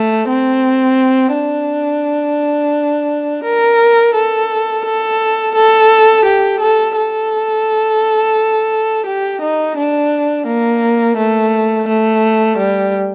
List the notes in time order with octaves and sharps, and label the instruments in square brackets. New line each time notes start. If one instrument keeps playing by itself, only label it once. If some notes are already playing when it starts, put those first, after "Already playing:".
Already playing: [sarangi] A3
C4
D4
A#4
A4
A4
A4
G4
A4
A4
G4
D#4
D4
A#3
A3
A3
G3